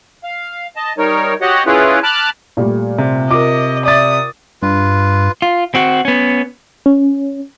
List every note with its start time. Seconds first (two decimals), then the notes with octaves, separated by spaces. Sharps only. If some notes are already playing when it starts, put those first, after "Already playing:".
0.24 F5
0.76 D#5 A5
0.98 G3 D#4 A#4 C#5
1.41 F#4 G4 C#5 D#5 F#5
1.66 C#4 E4 F4 G#4 B4 C#5
2.03 A5 B5 D6 F6 F#6
2.57 A#2 G3 A3
2.98 C3
3.31 F4 A#4 D#5 D6
3.85 D5 E5 D#6 A6
4.62 G2 F4 B4
5.42 F4
5.75 C4 F#4
6.05 B3 C#4
6.86 C#4